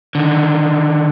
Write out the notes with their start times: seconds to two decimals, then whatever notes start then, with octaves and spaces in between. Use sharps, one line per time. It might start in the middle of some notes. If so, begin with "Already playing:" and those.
0.15 D3 D#3